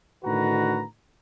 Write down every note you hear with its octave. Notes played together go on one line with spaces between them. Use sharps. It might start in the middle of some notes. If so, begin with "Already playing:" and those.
A2 D3 D#3 F#4 B4 A#5